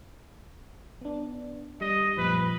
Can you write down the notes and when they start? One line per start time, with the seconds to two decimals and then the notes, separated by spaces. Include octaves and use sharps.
1.01 B3 D4
1.81 G3 D#5
2.18 F#2 A#2 F3 B4